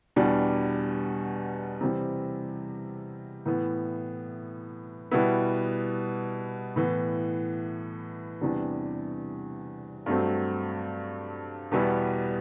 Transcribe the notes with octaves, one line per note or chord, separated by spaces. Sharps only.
E2 B2 G3 D4
C3 E3 G3 C4
A2 E3 B3
B2 G3 B3 E4
A2 E3 B3
E2 C3 E3 G3 D4
G2 F#3 A3 C4
E2 B2 G3 B3 E4